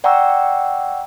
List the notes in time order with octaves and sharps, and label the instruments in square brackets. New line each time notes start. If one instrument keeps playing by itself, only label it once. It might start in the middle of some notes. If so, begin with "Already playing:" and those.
[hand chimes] D5 F#5 G5 A#5 C#6 E6